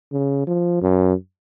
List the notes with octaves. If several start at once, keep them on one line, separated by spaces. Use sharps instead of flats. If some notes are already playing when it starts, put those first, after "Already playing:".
C#3
F3
F#2